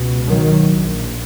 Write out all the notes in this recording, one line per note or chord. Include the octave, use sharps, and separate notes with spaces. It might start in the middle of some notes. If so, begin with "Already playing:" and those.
Already playing: C#2 B2
D#3 F#3
A#1 A#2